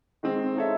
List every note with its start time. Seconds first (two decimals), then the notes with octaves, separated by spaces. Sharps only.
0.23 D#3 G#3 C4
0.55 G#3 D#4 A4 C#5 E5